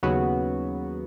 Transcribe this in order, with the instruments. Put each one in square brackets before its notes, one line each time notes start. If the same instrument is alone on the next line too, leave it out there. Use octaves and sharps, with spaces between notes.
[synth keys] D#2 C#3 F#3 B3 F#4